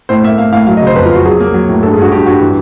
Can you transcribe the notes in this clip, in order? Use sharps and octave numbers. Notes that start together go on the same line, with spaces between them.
A2 C5
A#3 E5
A#3 F5
A2 F5
F#3 F5
D#5
C#3 C5
F2 B4
F4
F2
F#4
F#3 G#4
A#3
F#3
A2
G2 A4
G#4
G2 F#4
G2 G4
G2 F#4
E3